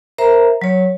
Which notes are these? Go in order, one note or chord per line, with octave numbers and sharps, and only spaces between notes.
A#4 C5 E5 A#5
F#3 C#5